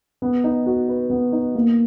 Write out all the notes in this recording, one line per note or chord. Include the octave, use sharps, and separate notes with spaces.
B3
D#4
F#4
B4
B3
D#4
A#3